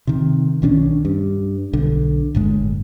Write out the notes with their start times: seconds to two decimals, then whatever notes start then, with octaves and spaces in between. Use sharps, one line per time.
0.07 C3 D#3
0.62 B1 D#3 C#4 D4
1.05 G2
1.73 B1 D3
2.35 G1 A2 G#3